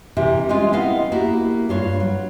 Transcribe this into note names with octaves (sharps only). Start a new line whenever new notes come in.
C3 E3 G4 A#4
G3 G#3 C4 C#4 F4
B3 C4 E4 D#5 F5
A#3 E4 F#4 G4
G2 F4 C#5
F#3